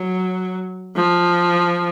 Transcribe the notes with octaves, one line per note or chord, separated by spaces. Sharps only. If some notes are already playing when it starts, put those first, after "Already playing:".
Already playing: F#3
F3